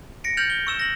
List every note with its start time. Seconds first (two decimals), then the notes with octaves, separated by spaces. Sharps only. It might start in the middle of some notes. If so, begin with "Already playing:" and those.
0.24 A#6 C#7 D7
0.37 F6 G6 A6 C#7 F7 F#7
0.50 G7
0.67 C#6 E6 E7
0.80 A#6 F#7